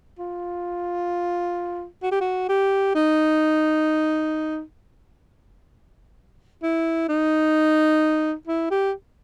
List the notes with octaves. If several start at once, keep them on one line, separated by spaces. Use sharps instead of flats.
F4
F#4
G4
F#4
G4
D#4
E4
D#4
E4
G4